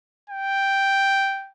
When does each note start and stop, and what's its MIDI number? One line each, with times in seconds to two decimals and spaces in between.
0.30 1.50 79